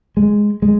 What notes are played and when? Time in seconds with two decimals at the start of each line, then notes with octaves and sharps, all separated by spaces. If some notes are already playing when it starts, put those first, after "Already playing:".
0.17 G#3
0.62 G#3